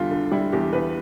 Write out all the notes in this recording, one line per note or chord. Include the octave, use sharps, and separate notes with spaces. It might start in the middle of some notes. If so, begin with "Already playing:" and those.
Already playing: E2 D3 G3 F4
D3
G3 E4
E2 G4
E2 B4